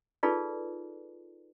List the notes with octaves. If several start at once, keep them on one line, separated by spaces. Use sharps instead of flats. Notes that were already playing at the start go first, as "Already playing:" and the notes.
D#4 F4 G#4 A4 B4 D5